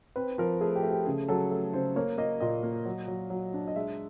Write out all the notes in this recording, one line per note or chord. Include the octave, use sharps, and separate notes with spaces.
C4 B4
F3 A#4
A3 G#4
G4
A3
G4
C#3 G#4
F#3 A4
A3
C#3 C5
A#3 C#5
A#3 D#5
A#2 D#5
A#3
F#3
F#3
F#3
D4
D#5
G#3 E5